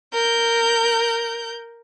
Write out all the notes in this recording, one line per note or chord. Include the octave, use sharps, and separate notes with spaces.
A#4 G6